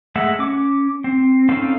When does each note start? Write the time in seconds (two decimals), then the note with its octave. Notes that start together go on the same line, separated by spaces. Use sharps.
0.16 G#3 A3 E5 F#5
0.39 C#4 D6
1.04 C4
1.49 C4 C#4 D#4 A4 F5